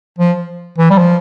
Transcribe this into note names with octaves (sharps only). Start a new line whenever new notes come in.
F3
E3
G3
F3